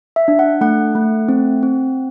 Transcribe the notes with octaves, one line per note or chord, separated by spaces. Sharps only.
E5
D4
F#5
A3 F#5
A3
C4
C4